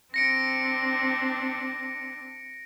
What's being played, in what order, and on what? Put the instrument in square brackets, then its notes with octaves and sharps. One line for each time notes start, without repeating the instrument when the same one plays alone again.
[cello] C4 D4 [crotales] A#6 C#7 D7